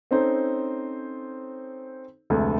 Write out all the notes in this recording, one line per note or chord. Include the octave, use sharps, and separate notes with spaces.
C4 C#4 D#4 A4 C5
F1 D2 D3 G#3 A3